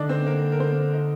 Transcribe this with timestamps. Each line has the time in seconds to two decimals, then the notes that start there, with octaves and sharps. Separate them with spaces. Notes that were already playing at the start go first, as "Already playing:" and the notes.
Already playing: D3 D4 D#4 D5
0.09 C4 C5
0.26 A#3 A#4
0.52 A#4
0.60 C4 C5
0.94 D#4 D#5